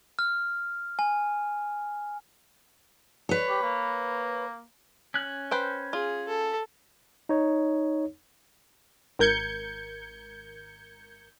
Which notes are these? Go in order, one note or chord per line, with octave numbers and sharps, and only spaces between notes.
F6
G#5
B4 C#5
G4
A#3
C#4 F#6
B4 C5 G5
F4 G#4
A4
D#4 C#5
G#1 A#4 G6 G#6 C#7